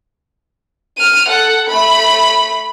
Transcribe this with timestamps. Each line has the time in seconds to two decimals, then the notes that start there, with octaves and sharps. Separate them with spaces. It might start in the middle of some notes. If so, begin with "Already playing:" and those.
0.97 F6 D#7
1.28 A4 F#5
1.69 A3 B5